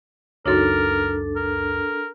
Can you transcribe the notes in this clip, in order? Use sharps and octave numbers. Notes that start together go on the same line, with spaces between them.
C#2 F#2 D4 D#4 F#4 A4 A#4 C#5
A#4